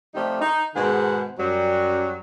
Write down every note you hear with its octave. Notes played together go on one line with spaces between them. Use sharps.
C3 F3 G3 A3 D#4 G4
D#4
G#2 B2 D#3 G#4 C5 F#5
F#2 F#3 G3